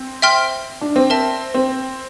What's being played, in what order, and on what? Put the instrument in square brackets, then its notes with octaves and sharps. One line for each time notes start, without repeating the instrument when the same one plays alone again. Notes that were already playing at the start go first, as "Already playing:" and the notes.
Already playing: [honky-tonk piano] C4
[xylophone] E5 G5 C6 F6
[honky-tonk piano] D4
C4
[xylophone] A#4 E5 A5
[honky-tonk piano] C4